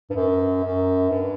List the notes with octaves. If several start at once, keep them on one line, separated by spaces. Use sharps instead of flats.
G2
F#2
F#2
G2